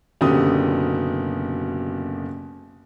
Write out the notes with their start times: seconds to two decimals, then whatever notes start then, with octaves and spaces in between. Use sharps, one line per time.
0.21 F#1 B2 D3 C#4 G4 D#6